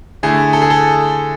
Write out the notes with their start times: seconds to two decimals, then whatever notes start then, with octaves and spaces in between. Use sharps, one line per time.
0.23 D3 A3 E4 G#4
0.53 A4
0.62 G#4
0.70 A4